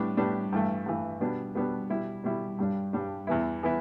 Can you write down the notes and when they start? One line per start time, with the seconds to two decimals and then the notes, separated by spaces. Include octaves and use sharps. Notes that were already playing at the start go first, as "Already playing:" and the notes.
Already playing: A2 G3 B3 D4
0.17 A2 G3 B3 D4
0.52 G2 E3 A3
0.86 G2 E3 A3
1.21 B2 G3 B3 D4
1.55 B2 G3 B3 D4
1.90 B2 G3 E4
2.24 B2 G3 E4
2.59 G2 G3 D4
2.93 G2 G3 D4
3.27 E2 E3 B3 E4
3.63 E3 B3 E4